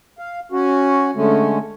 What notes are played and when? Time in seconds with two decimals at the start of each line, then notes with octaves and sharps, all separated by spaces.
0.18 F5
0.52 C#4 F#4
1.16 D3 G#3 A3 C#4